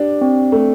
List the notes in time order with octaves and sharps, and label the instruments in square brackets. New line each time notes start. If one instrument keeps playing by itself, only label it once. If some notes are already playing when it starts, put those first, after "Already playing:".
Already playing: [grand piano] D4 [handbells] G4
[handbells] C4
[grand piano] A3